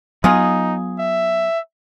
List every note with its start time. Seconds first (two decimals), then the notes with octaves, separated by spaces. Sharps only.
0.24 F#3 B3 D#4 F4 G#4
0.99 E5